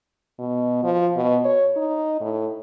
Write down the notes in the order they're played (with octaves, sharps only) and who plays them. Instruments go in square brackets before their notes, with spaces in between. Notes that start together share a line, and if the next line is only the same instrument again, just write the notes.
[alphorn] B2
F3
B2
C#5
D#4
A2